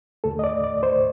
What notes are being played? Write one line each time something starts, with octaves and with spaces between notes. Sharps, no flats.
D#2 D3 A3 A4
D#5
D5
D5
C5